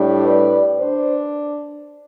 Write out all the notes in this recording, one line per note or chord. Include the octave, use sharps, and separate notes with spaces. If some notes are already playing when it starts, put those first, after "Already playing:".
Already playing: A2 G3 D4
B4 D5
D4 C5